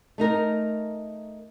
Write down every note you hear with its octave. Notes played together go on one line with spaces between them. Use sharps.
A3 D#4 A#4